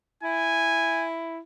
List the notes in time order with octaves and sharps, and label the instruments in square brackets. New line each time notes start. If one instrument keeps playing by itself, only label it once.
[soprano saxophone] E4 [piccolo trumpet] G#5